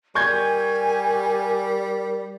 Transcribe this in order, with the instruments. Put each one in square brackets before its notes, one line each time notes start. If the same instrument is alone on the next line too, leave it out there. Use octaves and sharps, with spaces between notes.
[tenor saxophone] G3 [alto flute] A#4 [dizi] G#5 [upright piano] C#6 G6 G#6